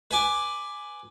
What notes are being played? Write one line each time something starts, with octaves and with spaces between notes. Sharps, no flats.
B4 G#5 D6